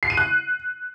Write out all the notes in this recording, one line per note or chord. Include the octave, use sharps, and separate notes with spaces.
C7
D#7
F#6